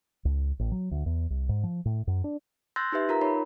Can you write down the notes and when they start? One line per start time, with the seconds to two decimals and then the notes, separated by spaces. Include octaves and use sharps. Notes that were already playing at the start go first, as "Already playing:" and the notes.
0.25 C#2
0.59 A1
0.72 F#3
0.91 D2
1.06 E2
1.30 C2
1.49 G#2
1.63 F3
1.85 A2
2.07 F#2
2.24 D4
2.76 C6 E6 F#6 G6 A6 A#6
2.92 D#4 G4 B4 E5
3.09 F4 A#4 A#5
3.21 D#4 C#5 B5